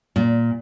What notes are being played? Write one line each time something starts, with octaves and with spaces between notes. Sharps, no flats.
A#2